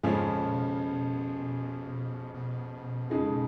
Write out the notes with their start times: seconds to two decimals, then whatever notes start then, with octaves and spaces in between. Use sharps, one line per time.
0.03 F2 G#2 C#3 F3 G#3 C#4
0.29 A#2
0.55 B2
2.34 B2
3.10 F2 C#3 G#3 D#4 G#4